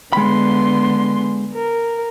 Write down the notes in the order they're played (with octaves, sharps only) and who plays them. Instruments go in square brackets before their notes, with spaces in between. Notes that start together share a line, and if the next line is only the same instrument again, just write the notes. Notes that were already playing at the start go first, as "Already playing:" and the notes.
[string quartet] D3 B3 C6 [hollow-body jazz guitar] G#3 B5
[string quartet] A#4